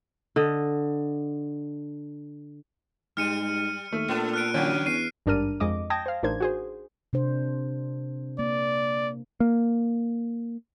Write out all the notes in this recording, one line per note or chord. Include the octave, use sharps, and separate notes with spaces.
D3 D#5
G#2 G3 F6 C#7 D#7
D#2 A3
A#2 B3 D4 A4
F6 F#6 D7
D3 F#3 C#4 D4
E2 C7 D#7
G#1 G2 D4 A#4 F6 D#7
F2 G#3 D#5 D6
G5 A5 D#6 G6 G#6 A#6
C5 F5
A1 D4 D#4 A#4 C5 G#6
F#4 G#4 C5
C3 D4 C5
A#3 D5
A#3